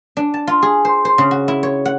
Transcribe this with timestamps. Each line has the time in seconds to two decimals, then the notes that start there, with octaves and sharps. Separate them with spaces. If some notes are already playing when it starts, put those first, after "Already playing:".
0.17 D4
0.34 A5
0.47 F4
0.62 G#4
0.85 C5
1.05 C5
1.18 C#3
1.31 F#4
1.48 E4
1.63 C#5
1.85 F#5